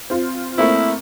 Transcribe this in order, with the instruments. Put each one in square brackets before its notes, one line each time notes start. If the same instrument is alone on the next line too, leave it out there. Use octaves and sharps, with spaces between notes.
[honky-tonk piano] C4 F4
[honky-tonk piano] A3 A#3 C4 [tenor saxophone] E4